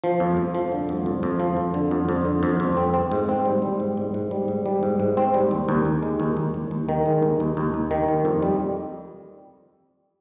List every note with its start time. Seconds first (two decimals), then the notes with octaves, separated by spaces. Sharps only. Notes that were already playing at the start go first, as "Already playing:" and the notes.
0.04 F3
0.20 F2
0.37 F2
0.55 F3
0.72 D3
0.89 F2
1.06 F2
1.23 F2
1.40 F3
1.57 F2
1.74 D3
1.91 F2
2.09 F2
2.25 D3
2.43 F2
2.60 F2
2.77 C4
2.94 C4
3.12 G#2
3.29 C4
3.46 G3
3.62 G3
3.80 G#2
3.97 G#2
4.14 G#2
4.31 G3
4.48 G#2
4.66 G3
4.83 G#2
5.00 G#2
5.17 C4
5.34 G3
5.51 D#2
5.69 D#2
5.85 D#2
6.03 G#3
6.20 D#2
6.37 D#2
6.54 D#2
6.71 D#2
6.89 D#3
7.06 G#3
7.22 D#2
7.40 D#2
7.57 D#2
7.74 D#2
7.91 D#3
8.08 D#2
8.25 F2
8.42 G3